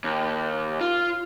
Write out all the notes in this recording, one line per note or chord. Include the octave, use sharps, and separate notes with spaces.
D#2
F4